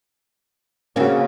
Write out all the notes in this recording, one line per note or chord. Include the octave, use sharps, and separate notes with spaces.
C#3 A#3 C4 C#4 F#4